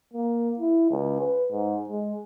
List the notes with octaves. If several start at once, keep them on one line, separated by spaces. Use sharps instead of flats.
A#3
E4
C#2
B4
G#2
G#3